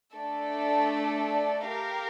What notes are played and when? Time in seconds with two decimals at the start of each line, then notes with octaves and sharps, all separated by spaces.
0.16 A3 D4 A4 D5
1.70 G4 A#4 F5